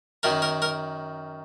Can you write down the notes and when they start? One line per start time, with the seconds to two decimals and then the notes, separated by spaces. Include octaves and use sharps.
0.23 F#2 D#3 A#4
0.42 A#4
0.62 A#4